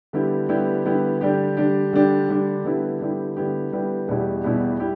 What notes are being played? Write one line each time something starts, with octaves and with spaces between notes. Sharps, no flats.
D3 G3 B3 E4 G4
D3 G3 B3 E4 G4
D3 G3 B3 E4 G4
D3 G3 D4 G4
D3 G3 D4 G4
D3 G3 D4 G4
D3 G3 D4 G4
D3 G3 B3 E4 G4
D3 G3 B3 E4 G4
D3 G3 B3 E4 G4
D3 G3 B3 E4 G4
E2 B2 G3 E4 G4
E2 B2 G3 E4 G4
G3 E4 G4